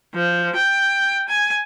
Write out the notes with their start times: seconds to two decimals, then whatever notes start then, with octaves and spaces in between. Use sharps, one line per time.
0.15 F3
0.55 G5
1.28 G#5